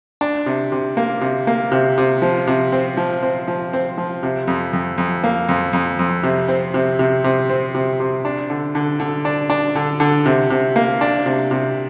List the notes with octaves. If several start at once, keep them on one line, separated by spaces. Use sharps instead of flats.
D4
C3
C3
A#3
C3
A#3
C3
C3
F3
C3
C4
F3
C4
F3
C4
F3
C3
F2
F2
F2
A#3
F2
F2
F2
C3
C4
C3
C3
C3
C4
C3
C3
D4
D3
D3
D3
D4
D4
D3
D3
C3
C3
A#3
D4
C3
C3